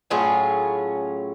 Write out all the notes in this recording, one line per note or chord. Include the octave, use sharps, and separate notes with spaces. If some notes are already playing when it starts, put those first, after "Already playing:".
A2 F#3 C#4 F4 G#4